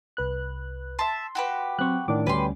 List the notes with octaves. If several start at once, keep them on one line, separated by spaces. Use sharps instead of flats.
C2 B4 F#6
E5 A5 C6
F#4 G4 B4
F#3 C4 C5 C#6 F#6
A2 D#3 D4 D6
D2 G3 C#4 B4 G5 C6